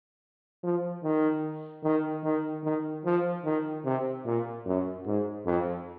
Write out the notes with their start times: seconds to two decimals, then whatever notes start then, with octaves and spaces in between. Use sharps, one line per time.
0.64 F3
1.04 D#3
1.84 D#3
2.24 D#3
2.64 D#3
3.05 F3
3.45 D#3
3.85 C3
4.25 A#2
4.66 F#2
5.06 G#2
5.45 F2